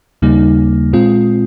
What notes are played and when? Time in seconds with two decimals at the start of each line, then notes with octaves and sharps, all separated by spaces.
0.22 D#2 C#3 G3 A#3 D#4
0.93 A#2 G#3 C4 F4